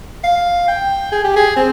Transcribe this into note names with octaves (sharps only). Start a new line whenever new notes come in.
F5
G5
G#4
G4
G#4
C4